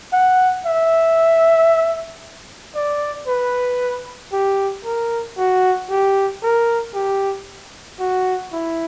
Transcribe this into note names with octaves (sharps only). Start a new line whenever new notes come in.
F#5
E5
D5
B4
G4
A#4
F#4
G4
A#4
G4
F#4
E4